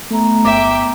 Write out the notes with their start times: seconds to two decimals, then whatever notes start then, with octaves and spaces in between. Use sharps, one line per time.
0.10 A3 B3 A#5
0.45 G1 E5 G5 D6